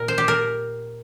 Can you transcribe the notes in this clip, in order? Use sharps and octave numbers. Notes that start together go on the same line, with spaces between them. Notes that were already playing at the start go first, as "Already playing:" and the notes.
Already playing: A#2 A#4
C5
G4
A#4